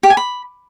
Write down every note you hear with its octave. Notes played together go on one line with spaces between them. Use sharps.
G4
G#5
B5